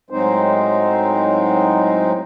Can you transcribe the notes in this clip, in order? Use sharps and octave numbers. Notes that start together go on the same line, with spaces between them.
A2 F#3 G#3 C4 D#4 C5